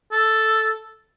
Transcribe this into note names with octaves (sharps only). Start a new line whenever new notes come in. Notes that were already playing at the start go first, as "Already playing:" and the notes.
A4